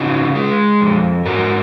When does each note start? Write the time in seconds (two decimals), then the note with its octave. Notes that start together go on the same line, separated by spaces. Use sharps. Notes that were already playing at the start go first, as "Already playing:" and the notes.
Already playing: C#3 D#4 F#4
0.35 G#3
0.81 F2
1.26 G#2 F#4 A#4